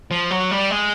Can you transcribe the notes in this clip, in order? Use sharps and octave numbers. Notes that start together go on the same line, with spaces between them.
F3
F#3
G3
G#3